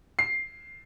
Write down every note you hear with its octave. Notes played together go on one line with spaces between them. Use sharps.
C7